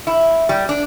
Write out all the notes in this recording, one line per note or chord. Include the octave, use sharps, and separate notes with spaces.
E4
G3
D4